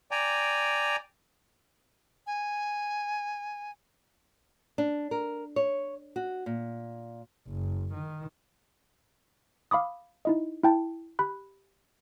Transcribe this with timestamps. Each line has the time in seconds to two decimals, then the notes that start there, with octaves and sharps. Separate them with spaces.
0.11 D5 G5 G#5 A#5
2.27 G#5
4.78 D4
5.11 A#4
5.56 C#5
6.16 F#4
6.46 A#2
7.48 F#1
7.93 D#3
9.71 F5 B5 D6 D#6
10.25 D#4 E4 D#5
10.64 E4 G5 A5
11.19 G4 B5 F#6